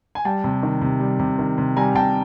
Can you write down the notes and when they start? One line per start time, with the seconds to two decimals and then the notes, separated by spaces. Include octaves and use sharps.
0.15 G#5
0.25 G3 G5 A5
0.44 C3
0.63 D#3
0.82 C3
1.00 G3
1.20 C3
1.39 D#3
1.58 C3
1.76 G3 G#5 A#5
1.95 C3 G5 A5